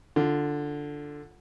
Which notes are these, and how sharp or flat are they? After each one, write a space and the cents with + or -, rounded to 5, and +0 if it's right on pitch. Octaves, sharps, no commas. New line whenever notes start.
D3 +0 F4 +0